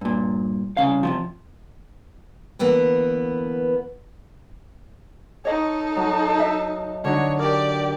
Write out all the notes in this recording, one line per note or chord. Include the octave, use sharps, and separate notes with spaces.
G2 A#2
C2 C#3 F5
C3 D#3 F3
D2 E3 A#3 B3
D#4 A4 C#5 D#5
F#3
D#5 E5
D3 F#3 D#4 C#5
G4 A#4 D5